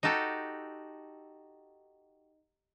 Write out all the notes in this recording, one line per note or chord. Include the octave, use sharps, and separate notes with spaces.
D#4 F#4 G4 A4